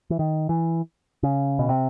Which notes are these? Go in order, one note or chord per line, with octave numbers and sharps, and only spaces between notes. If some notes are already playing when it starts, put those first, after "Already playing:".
E3
D#3
E3
C#3
B2
C3